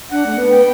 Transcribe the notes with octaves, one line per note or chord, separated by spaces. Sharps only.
D4 F#5
A3
B3
G5